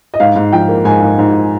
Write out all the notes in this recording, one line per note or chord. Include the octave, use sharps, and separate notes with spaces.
D#5
G#2 F5
G#2
F3 G5
A#3
G#2 G#5
G#2
G#2